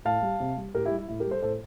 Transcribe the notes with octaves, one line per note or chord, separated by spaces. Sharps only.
A2 F5 A5
G3
C3
G3
A2 G4 A#4
E4 G4
G3
E4
A2 E4
G4 A#4
G3
A4 C5
A2 A4 C5